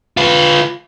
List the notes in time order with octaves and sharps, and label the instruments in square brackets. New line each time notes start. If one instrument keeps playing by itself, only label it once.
[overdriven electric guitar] F4 B4